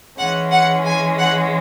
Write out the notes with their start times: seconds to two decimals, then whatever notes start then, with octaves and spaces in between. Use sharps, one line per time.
0.18 E3 G#3 C#4 F#5
0.52 F#5
0.85 G#5
1.18 F#5